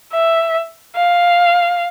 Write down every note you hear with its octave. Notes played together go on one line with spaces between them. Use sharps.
E5
F5